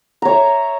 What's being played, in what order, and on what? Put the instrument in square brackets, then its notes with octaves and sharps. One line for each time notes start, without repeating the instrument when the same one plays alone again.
[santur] A#5
C#5
E5